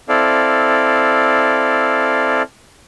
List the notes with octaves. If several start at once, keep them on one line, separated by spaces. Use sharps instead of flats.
C4 E4 A4 D5 F5